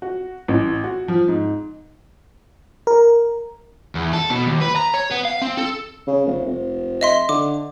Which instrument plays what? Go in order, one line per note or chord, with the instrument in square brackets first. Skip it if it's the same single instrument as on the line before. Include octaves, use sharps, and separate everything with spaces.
[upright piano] F#4
A1
F#4
F3
G#2
[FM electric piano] A#4
[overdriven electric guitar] E2
A4
B2
D#2
B4
A#5
C#5
B3
F5
C4
A4
[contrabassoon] C#3
F1
F1
[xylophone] D#5 E5 C6
[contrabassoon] D3 [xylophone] D6